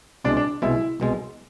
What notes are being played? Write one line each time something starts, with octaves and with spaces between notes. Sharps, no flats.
C2 B2 G#3 D4
D4
C2 B2 G#3 E4
C2 B2 G#3